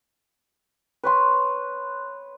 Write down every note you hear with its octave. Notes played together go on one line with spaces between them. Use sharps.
B4 C#5 C6